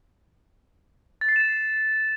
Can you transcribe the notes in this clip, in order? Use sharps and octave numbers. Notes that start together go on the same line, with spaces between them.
A6
C7
E7